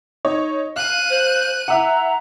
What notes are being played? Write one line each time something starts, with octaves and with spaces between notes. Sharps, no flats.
D#4 C#5
F5 F#6 D#7
C5
E4 E5 F#5 A#5